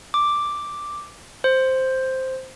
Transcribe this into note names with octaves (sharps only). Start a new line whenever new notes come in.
D6
C5